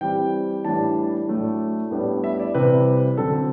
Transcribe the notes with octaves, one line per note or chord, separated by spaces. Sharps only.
E3 G3 C4 G5
A2 E3 G3 D4 A5
A2 F#3 A3 D4
A2 G3 B3 D4
E5
D5
C3 E3 G3 C4 B4
D3 F#3 C4 A4